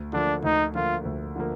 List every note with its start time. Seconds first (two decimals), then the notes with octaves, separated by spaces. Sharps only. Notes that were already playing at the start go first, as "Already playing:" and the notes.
Already playing: D2
0.13 D3 F3 A#3 D4
0.43 D2 D#4
0.75 D3 F3 A#3 F4
1.05 D2
1.36 D3 F3 A#3